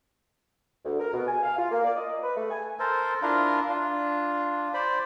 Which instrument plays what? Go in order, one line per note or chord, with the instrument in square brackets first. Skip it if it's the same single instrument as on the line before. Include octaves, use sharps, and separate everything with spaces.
[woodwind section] D2
A#4
B2
G#5
F5
F4
A#3
D5
D#5
B4
A3
G#5
[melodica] A4 A#4 C5
D4 E4 F4 A#4
D4 F4
C5 D5 B5